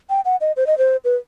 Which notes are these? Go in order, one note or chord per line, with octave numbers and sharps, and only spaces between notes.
G5
F#5
D#5
C5
D#5
C5
B4